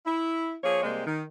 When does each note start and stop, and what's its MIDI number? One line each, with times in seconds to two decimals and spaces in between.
0.06 0.55 64
0.63 0.81 53
0.63 0.81 58
0.63 0.81 68
0.63 0.81 73
0.82 1.05 48
0.82 1.05 55
0.82 1.05 56
0.82 1.05 58
0.82 1.05 72
1.05 1.22 51